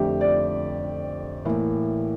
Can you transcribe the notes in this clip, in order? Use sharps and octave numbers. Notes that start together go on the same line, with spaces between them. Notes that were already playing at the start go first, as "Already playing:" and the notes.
Already playing: F2 D3 A3 D4 G4
D5
A2 E3 A#3